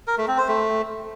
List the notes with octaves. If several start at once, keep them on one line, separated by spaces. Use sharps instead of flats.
A#4
A3
C4
C5
A3